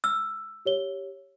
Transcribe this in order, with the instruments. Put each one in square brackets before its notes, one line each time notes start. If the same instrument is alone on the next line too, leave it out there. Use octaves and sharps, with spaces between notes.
[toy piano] E6 [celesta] F6
[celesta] G4 C#5 G7